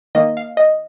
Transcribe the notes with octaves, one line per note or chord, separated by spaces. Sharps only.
D#3 A#3 D#5
F5
D#5